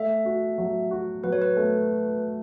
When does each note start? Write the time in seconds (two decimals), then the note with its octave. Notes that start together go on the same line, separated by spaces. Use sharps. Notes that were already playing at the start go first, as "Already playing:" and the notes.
Already playing: A3 E5
0.25 F#4
0.58 F#3
0.91 F#4
1.24 F#3 B4
1.33 C#5
1.42 B4
1.57 A3